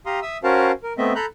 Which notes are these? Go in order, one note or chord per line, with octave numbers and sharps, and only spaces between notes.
G4 F5 A#5 C6 D#6
E5 D#6 E6
C#4 F#4 A#4 C5 F5 A5
A#4
A3 B3 C4 D#5 E5
A4 A#5 B5 F#6 G6